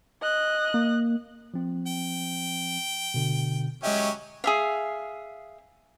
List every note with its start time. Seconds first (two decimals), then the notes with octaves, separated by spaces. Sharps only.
0.22 D#5 F#6
0.74 A#3
1.54 F3 C4
1.87 G5
3.14 B2 D3
3.83 F#3 G#3 C#4 G4 D#5 E5
4.44 G#4 E5 F5